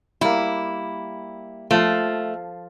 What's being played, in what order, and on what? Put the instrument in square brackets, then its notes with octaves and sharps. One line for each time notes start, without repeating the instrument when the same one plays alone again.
[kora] G3 A#3 [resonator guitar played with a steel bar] E4
[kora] F3 F4 [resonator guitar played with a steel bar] A3